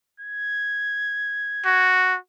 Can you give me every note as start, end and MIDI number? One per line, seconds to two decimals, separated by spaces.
0.20 1.90 92
1.66 2.17 66